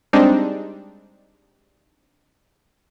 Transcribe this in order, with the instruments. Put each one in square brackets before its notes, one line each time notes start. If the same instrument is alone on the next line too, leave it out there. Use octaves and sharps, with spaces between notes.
[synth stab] G3 G#3 C4 D4 D#4